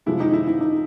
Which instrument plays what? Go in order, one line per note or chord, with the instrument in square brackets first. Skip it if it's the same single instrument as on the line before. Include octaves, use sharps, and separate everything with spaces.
[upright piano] C3 F3 G#3 E4
D#4
E4
E4
D#4